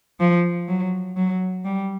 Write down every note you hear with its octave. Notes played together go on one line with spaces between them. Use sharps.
F3
F#3
F#3
G3